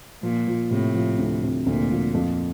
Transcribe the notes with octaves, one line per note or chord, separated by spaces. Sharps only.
A#2 F3
F3
A2 C3
F3
D2
C3
D2 A#2
F3
F2